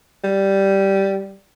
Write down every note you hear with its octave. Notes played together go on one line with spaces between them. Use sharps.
G3